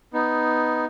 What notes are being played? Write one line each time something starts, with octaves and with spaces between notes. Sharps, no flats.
B3 D#4